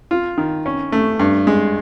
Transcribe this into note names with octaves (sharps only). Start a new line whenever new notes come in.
F4
D#3
C#4
A3
G2
G#3